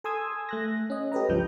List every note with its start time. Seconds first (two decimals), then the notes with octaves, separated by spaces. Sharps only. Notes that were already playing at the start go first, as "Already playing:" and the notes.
0.04 A4 G#5 C6 D#6 E6 G#6
0.49 A3 F#6 A#6
0.90 C#4 D#5
1.12 G4 A4 B4 D#5 A#5
1.29 C#2 G2 F3 G6